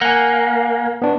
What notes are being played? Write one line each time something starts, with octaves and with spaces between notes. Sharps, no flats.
A#3 F#5 G#5
B3 D4